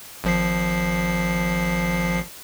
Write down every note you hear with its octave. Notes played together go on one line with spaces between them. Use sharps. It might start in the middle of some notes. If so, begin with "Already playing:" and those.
G#1 F3 C7